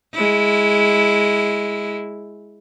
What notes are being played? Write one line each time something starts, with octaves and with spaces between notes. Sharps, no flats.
G#3 E4